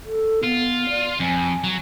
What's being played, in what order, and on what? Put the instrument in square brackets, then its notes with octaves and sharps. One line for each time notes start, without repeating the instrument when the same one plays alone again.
[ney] A4
[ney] B3 [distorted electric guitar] F4
[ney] D5
[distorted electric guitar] F2 [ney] G#5
[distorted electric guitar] F#3